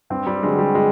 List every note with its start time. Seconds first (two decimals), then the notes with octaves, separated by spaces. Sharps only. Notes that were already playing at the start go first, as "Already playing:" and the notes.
0.10 G2 C4
0.27 G3
0.43 D3 F#3 G#3
0.59 G3
0.75 G#3